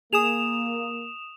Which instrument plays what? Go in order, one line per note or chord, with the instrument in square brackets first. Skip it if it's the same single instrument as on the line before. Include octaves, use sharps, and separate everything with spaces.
[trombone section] A#3 [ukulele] G#4 [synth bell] D#6 E7 F7